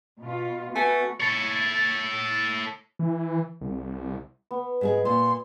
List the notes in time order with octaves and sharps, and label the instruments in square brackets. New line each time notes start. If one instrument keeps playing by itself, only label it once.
[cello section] B2 F4
[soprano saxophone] A3 [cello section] B3 F#4 [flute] B4 [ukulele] G#5
[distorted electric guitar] A4 C#5
[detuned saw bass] E3
C2
[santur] B3
[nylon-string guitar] G#2 G#3 G#4
[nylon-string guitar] A#2 [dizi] C6